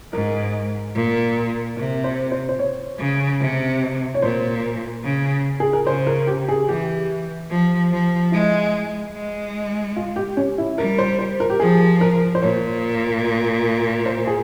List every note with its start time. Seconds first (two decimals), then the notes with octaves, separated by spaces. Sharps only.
0.13 G#2 A#4
0.95 A#2
1.77 C3 A#4
2.04 C5
2.32 C5
2.49 C5
2.59 C#5
2.99 C#3
3.40 C3
4.14 C#5
4.22 A#2 C5
5.04 C#3
5.60 G#4
5.73 A#4
5.87 C#3 C5
6.07 A#4
6.27 G4
6.48 G#4
6.69 E3 G4
7.50 F3
7.91 F3
8.32 G#3 E4
9.14 G#3
9.96 F4
10.16 G4
10.37 C#4
10.58 E4
10.78 G3 A#4
10.98 C5
11.19 C5
11.40 A#4
11.50 G4
11.60 F3 G#4
12.01 A#4
12.35 C5
12.42 A#2 C#5
14.06 C5
14.27 G#4